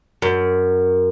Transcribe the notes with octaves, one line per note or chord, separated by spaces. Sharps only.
F#2